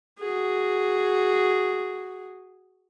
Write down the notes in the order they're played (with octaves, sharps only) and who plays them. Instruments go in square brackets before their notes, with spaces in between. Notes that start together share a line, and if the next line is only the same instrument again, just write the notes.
[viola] F#4 G#4